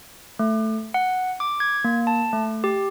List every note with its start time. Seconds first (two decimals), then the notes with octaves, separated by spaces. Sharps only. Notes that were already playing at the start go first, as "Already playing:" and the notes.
0.39 A3
0.94 F#5
1.40 D6
1.60 G#6
1.84 A#3
2.07 A5
2.33 A3
2.64 G4